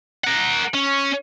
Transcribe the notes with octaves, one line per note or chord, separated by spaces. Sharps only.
A#4 F#5
C#4